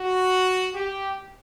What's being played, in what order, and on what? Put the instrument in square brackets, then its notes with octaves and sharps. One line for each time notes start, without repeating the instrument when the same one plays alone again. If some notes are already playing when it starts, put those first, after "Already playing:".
Already playing: [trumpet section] F#4
G4